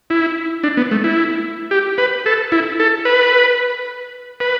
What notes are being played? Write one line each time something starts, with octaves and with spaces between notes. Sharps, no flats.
E4
D4
B3
A3
E4
G4
B4
A4
E4
A4
B4
B4